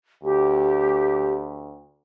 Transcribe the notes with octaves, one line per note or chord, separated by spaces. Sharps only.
D2 G4